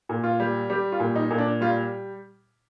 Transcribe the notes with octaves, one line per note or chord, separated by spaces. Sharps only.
A#2
F4
G3
G3 G4
F4
A#2
D#4
A#2
D4
G3 F4